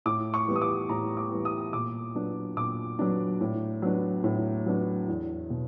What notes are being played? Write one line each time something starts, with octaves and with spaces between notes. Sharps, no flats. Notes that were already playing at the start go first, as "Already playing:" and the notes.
A2 D6
C#6
E3 G3 B3
D#6
D6
A2 A#5
D6
E3 G3 B3
D#6
A#2 D6
F#3 B3 D4
A#2 D6
F#3 B3 D4
A2
F#3 B3 D4
A2
F#3 B3 D4
E2
B2